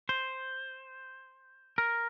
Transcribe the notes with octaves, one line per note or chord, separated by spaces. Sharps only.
C5
A#4